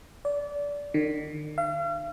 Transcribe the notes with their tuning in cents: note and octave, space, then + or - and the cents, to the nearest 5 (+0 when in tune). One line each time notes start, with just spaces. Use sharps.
D5 -25
D#3 -45
F5 -40